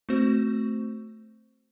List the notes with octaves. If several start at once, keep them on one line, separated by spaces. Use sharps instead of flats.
A3 C4 F#4 C5